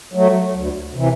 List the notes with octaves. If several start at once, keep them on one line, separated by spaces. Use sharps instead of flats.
F#3 A3
D2
C3 E3